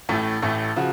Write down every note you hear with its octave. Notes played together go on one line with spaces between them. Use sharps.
A1 A2 A3
A1 A2 A3
C#3 F3 F#4